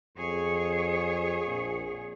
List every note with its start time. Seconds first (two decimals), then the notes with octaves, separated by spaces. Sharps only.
0.17 F2 G#4 C#5
1.46 A#1